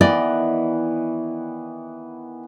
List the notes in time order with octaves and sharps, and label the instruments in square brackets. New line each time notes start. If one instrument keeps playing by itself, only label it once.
[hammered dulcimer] D#3 E3 B3 [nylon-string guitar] D5 D#5